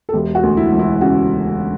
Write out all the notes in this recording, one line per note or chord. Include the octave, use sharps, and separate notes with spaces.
A4
E1 G4
F#4
D2
E4
E1
E4
C#3 F#4